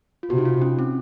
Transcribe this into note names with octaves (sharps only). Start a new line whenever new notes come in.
F4
C3 F#4
D#4
F4
C#4
C4